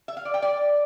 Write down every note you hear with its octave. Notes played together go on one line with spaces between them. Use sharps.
E5
F5
D5
G5
D5